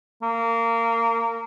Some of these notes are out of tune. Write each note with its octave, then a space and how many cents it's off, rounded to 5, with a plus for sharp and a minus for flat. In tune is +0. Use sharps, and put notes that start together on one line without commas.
A#3 -20